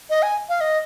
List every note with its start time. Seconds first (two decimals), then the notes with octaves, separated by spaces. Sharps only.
0.10 D#5
0.22 G#5
0.49 F5
0.60 D#5